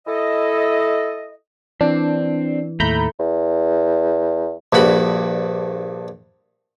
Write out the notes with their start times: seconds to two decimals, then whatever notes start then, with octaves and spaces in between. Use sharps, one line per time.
0.07 E4 A4 D#5
1.81 E3 C4 D4
2.80 D#2 A2 A3 A#5 B5 G6
3.19 E2
4.73 A#1 G2 F#4 B5